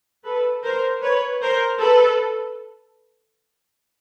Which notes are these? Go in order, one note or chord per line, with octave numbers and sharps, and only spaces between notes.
A4 B4
A#4 C5
B4 C#5
A#4 C5
A4 B4